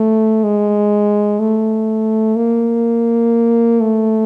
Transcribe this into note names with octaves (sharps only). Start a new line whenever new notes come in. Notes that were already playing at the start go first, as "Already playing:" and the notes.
Already playing: A3
G#3
A3
A#3
A3